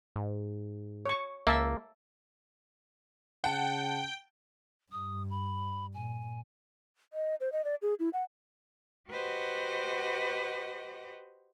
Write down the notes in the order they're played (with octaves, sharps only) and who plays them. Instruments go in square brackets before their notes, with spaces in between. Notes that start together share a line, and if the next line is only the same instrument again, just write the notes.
[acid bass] G#2
[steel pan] C#5 C#6
[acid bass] C#2 [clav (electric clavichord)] A#3 [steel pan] E5 A5 E6
[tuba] C#3 [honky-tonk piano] F#5 A5 [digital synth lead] G5
[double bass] G2 [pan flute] D#6
[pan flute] B5
[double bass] A#2 [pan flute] G#5
[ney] D#5
C5
D#5
D5
G#4
E4
F#5
[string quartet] F#4 G4 B4 C5 D#5 F#5